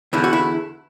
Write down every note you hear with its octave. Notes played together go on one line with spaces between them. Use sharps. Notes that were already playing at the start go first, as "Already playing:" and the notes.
E2 D3 E4
F#4
E4